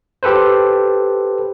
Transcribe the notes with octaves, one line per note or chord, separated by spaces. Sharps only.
G4 A4 B4 C5